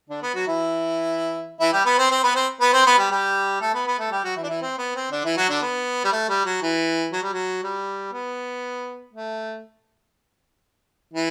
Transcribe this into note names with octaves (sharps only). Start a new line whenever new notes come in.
D3 D4
B3
F#3 F#4
E3 E4
E3 E4
G3 G4
B3 B4
C4 C5
C4 C5
B3 B4
C4 C5
B3 B4
C4 C5
B3 B4
G3 G4
G3 G4
A3 A4
B3 B4
B3 B4
A3 A4
G3 G4
F#3 F#4
E3 E4
D4
E3 E4
C4
B3
C4
D3 D4
E3 E4
F#3 F#4
D3 D4
B3
G3
A3
G3
F#3
E3
F#3
G3
F#3
G3
B3
A3
E3